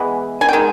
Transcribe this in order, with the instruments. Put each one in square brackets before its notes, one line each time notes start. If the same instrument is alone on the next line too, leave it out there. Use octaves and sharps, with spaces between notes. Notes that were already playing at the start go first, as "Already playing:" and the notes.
Already playing: [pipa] E3 G#3 B3
G#5
G5
D#3 G#3